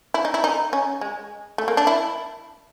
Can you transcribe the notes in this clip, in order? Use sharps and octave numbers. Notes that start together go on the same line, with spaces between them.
E4
D#4
E4
D#4
C#4
G#3
A3
A#3
D4
E4